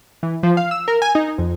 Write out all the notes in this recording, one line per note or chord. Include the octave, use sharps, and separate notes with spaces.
E3
F3
F5
E6
A#4
G#5
D#4
F2